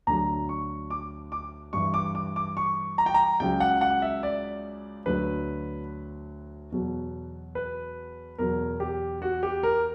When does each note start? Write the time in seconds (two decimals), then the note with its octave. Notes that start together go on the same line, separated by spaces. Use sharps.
0.07 D2 D3 F#3 A#5
0.49 C#6
0.90 D6
1.32 D6
1.73 G2 E3 C#6
1.94 D6
2.15 D6
2.36 D6
2.57 C#6
2.98 A#5
3.06 G5
3.14 A#5
3.40 C#2 C#3 F#3 G5
3.60 F#5
3.81 F#5
4.02 E5
4.23 D5
5.06 D2 D3 F#3 B4
6.72 E2 B2 F#3
7.55 B4
8.38 E2 B2 F#3 A#4
8.80 G4
9.22 F#4
9.43 G4
9.63 A#4